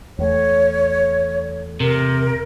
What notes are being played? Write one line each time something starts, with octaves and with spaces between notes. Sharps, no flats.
E2 A3 C#5
C3 A#4